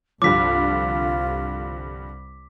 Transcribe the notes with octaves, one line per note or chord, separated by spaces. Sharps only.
C2 G2 D3 F3 F4 D6 B6